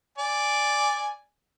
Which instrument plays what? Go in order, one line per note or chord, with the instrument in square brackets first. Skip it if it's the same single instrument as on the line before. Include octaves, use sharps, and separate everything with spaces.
[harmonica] D5 G#5